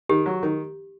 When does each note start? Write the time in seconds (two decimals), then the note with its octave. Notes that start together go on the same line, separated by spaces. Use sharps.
0.09 D#3 G4
0.26 F#3
0.43 D#3